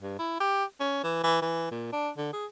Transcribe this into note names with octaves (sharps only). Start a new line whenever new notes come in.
G2
E4
G4
C#4
E3
E3
E3
A#2
D4
D3
G#4